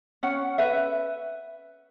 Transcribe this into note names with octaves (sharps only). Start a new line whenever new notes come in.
C#4 F#5
B4 E5